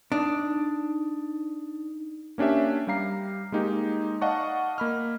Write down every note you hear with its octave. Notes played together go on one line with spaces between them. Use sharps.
D4 D#4
A#3 C#4 D4 G4 E5
G3 G4 F5 A#5 C7
G#3 A#3 D#4 G4
D5 D#5 F5 F#5 A5 C#6
A#3 B5 F6